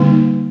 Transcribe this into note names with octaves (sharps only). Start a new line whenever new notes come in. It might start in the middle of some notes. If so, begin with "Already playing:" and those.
Already playing: D3 G3 A#3 D#4